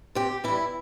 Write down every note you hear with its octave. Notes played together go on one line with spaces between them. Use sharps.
C3 G4
E3 G3 E4